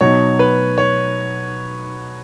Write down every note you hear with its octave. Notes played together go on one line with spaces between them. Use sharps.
B2 F#3 D#4 C#5
B4
C#5